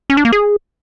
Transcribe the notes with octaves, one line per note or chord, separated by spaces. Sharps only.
C#4
D4
A#3
G#4